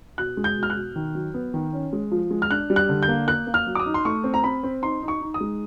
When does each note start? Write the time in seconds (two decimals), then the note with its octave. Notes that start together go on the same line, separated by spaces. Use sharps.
0.18 B2 F#6
0.37 G#3
0.44 G6
0.57 B2
0.63 F6
0.70 F#6
0.76 B2
0.96 D#3
1.15 F#3
1.34 B3
1.54 D#3
1.73 C#4
1.93 G#3
2.11 F3
2.31 G#3
2.42 F6
2.50 D4 F#6
2.70 G3
2.76 F#6
2.89 D3
3.03 G6
3.08 A#3
3.27 A#3 F#6
3.47 A#3
3.54 F6
3.67 F#3
3.75 D6
3.79 D#6
3.86 D#4
3.94 C6
4.05 A3 C#6
4.24 C4
4.34 A#5
4.43 C4 B5
4.63 C4
4.82 D#4 C6
5.02 D#4
5.08 C#6
5.21 D#4
5.34 D#6
5.41 G#3